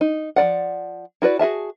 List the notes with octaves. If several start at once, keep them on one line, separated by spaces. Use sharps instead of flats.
D#4
F3 F#3 D5 F#5
E4 F#4 B4 D5
F#4 G#4 E5 A5